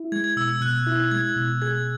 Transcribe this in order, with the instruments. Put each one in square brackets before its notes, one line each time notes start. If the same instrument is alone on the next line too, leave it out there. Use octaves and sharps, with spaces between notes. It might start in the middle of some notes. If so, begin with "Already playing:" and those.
Already playing: [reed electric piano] E4
[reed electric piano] G#3 [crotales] G#6
[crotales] G#6
[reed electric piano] B2 [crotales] E6
[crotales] E6
[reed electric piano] B2 [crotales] F#6
[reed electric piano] E4
[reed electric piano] G#3 [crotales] G#6
[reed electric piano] B2
[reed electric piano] G#4 [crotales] G#6